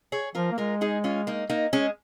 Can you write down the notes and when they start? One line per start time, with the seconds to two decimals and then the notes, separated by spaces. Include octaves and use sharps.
0.12 G#4 C#5
0.35 F3 F4 A#4
0.52 A#3
0.58 G#3 F4 A#4
0.81 D#4 G#4
1.04 C#4 F4
1.27 A#3 D#4
1.50 A#3 D#4
1.73 G#3 C#4